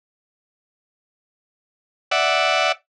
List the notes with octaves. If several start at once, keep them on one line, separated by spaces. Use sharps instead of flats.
D5 E5 F#5